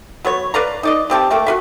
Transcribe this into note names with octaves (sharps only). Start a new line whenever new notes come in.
F#3 B3 C#5
B4 D5 F5 A#5
D#4 D5 D#5
C3 C4 G4 A5
A3 A#3 G5
F#4 B4 E5